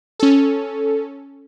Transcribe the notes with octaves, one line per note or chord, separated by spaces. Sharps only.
C#4 A4